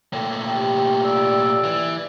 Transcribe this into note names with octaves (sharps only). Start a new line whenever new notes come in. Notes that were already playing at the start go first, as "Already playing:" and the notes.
A#2 A3 G5
G4
D5 E6
E3